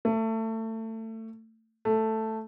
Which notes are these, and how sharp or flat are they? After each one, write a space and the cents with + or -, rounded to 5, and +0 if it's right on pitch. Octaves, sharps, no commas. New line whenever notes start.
A3 +25
A3 +5